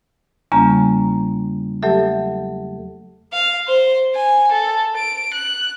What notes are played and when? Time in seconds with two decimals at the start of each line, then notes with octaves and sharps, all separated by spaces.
0.52 E2 C#3 G3 A#3 C#4 A#5
1.82 F#3 A3 G4 A4 E5
3.33 F5
3.67 C5
4.15 G#5
4.52 A4
4.97 D7
5.34 F#6